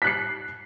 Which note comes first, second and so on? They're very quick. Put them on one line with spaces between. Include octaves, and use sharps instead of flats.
B6 F#6 C7